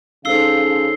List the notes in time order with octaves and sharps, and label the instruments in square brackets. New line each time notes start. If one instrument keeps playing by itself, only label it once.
[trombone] C#3 [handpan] D#4 A4 C5 [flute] F5 [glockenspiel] E6 C7 G7